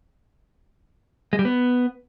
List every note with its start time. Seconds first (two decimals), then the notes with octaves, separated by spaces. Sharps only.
1.33 G#3
1.39 G3
1.45 B3